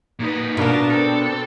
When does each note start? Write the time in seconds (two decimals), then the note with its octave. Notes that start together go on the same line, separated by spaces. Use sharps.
0.19 A#2 D#4 B4
0.57 B2 A#3 D4 F4 A#4 A5
0.90 C4 A4